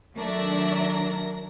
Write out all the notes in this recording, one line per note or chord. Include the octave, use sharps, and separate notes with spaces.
D#3 F#3 A3 D4 A#4 D5 E5